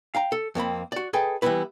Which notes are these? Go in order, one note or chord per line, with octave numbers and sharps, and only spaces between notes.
F5 G5 A#5
A4
F2 A#3 C4 B5
F#4 D5
G#4 A4 B4 D#5 G5 G#5
E3 G3 B3 C#4 E4 B4